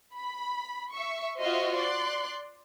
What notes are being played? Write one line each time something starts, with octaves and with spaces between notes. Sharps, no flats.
B5
E5 C#6
F4 F#4 C5 D#5 E5 F6
D5 C6 F#6